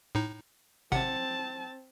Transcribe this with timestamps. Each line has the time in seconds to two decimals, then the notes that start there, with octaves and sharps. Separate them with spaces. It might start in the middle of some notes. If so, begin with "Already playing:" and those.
0.15 A2 D#4
0.92 G#1 C3 C4 F#5 A5